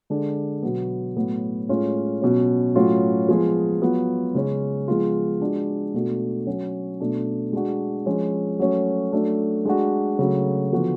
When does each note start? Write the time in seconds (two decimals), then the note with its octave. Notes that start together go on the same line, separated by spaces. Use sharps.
0.10 D3 G#3 D4
0.63 B2 F#3 B3
1.16 A2 F#3 B3
1.69 A2 G#3 C#4 F4
2.22 B2 F#3 C#4
2.76 A2 F#3 C#4 F4
3.29 F3 G#3 B3 F4 G#4
3.81 F#3 B3 F4
4.35 C#3 G#3 C#4
4.88 F3 G#3 B3 F4
5.41 G#3 D4 F#4
5.94 B2 A3 D4 F#4
6.47 F#3 C#4 F#4
7.01 B2 A3 D4
7.53 G#3 D4 F#4
8.06 F3 G#3 C#4
8.59 F#3 A3 C#4
9.12 F#3 A3 D4
9.65 G#3 D4 F#4
10.19 C#3 F#3 A3
10.72 D3 F3 B3 F#4